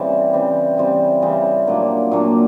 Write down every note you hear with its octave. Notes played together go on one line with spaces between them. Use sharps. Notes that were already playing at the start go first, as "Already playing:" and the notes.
Already playing: C#3 E3 G3 C4
C#3 E3 G3 C4
C#3 E3 G3 C4
C#3 E3 G3 C4
A#2 F#3 A#3 D4
A#2 F#3 A#3 D4